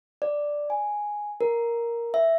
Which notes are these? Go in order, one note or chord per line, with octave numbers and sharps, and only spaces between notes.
D5
G#5
A#4
E5